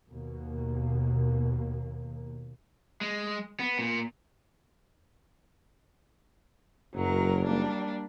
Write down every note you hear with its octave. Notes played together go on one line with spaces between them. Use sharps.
D#2 B2 A#3
G#3
B3
A#2
F#1 F#2 F#3 A#4
G3 A#3 D4